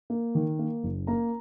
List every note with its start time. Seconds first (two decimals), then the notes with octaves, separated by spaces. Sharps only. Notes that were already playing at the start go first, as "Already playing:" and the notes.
0.10 A#3
0.35 D#3
0.59 A#3
0.83 F#1
1.07 A#3 A#5